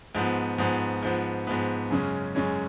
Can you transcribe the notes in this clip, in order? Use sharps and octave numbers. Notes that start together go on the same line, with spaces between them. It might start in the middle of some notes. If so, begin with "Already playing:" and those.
G#2 F3 B3
G#2 F3 B3
G#2 F3 B3
G#2 F3 B3
F#2 C#3 G#3 C#4
F#2 C#3 G#3 C#4